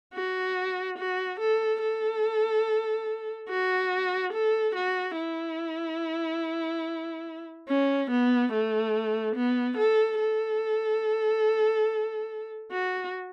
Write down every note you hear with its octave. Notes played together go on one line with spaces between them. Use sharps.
F#4
F#4
A4
A4
F#4
A4
F#4
E4
C#4
B3
A3
B3
A4
A4
F#4